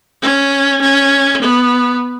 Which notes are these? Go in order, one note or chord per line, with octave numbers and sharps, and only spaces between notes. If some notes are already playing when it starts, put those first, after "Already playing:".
C#4
C#4
B3